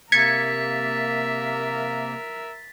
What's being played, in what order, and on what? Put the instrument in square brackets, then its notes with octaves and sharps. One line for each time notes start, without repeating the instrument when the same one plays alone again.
[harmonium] C3 A#3 [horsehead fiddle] A#4 E5 [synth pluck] G#6 C#7 [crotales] A6 B6